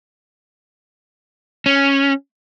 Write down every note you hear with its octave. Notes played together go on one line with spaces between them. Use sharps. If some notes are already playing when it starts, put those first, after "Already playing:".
C#4